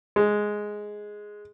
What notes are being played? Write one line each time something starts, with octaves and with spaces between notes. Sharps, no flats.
G#3